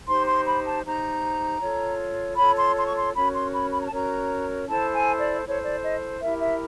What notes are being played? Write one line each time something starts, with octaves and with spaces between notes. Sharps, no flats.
D#4 G4 C5 C6
C6
B5
A5
D#4 G4 C5 A#5
F4 A4 C#5
F4 A4 C#5 B5
C6
C6
C#6
C6
C#4 F#4 A#4 C#5 B5
C6
B5
B5
A#5
A5
C#4 F#4 A#4 C#5 A#5
E4 A4 C5 A5
G#5
D5
E4 A4 C5 C#5
D5
D#5
E4 G4 A#4 E5
E5